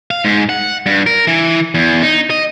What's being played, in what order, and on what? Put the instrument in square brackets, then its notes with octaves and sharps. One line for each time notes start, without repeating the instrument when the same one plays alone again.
[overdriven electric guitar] F5
G#2
F#5
G2
A#4
E3
E2
D#4
D#5